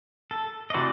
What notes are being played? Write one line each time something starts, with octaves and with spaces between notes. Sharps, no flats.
A4
D#5
C3 E3 A3 D4 F#4 D5